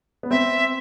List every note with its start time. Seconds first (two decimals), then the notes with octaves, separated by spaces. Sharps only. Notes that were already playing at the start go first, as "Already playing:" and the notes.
0.23 B3
0.31 C4 E5